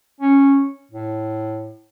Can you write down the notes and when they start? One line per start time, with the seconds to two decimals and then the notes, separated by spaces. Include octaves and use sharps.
0.21 C#4
0.92 A2